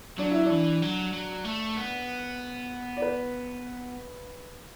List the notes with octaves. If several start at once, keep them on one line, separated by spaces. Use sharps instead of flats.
F#3 D4
E4
E3 D4
F#3
F#3
A3
B3
D5
B4